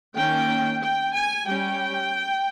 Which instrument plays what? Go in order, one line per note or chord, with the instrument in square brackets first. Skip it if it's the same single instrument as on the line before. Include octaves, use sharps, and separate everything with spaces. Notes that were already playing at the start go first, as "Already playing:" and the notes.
[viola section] D#3 A#3 C#4 G5
G5
G#5
G3 C#4 G5